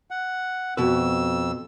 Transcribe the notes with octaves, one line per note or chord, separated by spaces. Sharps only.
F#5
F2 B2 B4 E6